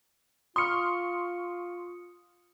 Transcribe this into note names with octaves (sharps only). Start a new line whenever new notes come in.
F4 C6 C#6 D#6 F6 C#7